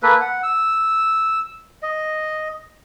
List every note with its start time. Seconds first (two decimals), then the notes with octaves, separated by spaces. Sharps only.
0.03 A#3 A4 B4
0.21 F#5
0.43 E6
1.83 D#5